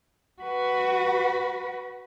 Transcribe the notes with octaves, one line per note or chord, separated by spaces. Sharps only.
F#4 B4